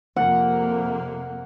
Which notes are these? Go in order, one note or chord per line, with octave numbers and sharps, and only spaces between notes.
F2 C3 A#3 F#5